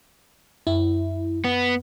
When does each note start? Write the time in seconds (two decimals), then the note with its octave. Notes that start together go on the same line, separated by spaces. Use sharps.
0.67 F#2 E4
1.45 B3